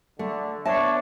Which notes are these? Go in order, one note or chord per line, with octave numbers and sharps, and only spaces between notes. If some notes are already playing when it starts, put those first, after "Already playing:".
D3 A3
B3 D4 C#5 E5 A5